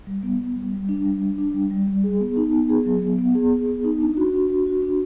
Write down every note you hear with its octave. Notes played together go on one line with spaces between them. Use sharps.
G3
B3
B3
G3
G3
D4
G3
D4
D4
G3
G3
G3
G#4
B3
D#4
B3
G#4
F#3
B3
B3
G#4
G#4
B3
D#4
D4
F#4
D4
F#4
F#4
D4